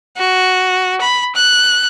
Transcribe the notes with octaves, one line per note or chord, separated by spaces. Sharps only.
F#4
B5
F#6